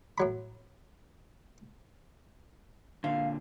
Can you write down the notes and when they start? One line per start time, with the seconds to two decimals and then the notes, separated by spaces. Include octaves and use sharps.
0.18 A2 F#3 B5
3.04 A#2 D3 F5